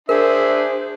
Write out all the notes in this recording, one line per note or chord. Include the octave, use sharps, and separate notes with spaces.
D4 G#4 A#4 C5 E5